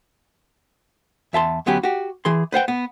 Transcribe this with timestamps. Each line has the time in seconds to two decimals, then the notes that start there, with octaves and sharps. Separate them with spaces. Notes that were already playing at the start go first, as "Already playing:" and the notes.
1.33 E2 E5 A5 C6
1.66 D2 F#3 B3 C#4 G4
1.83 F#4 G4
2.25 E3 G#4 C6
2.52 B4 C5 F#5 G5
2.68 B3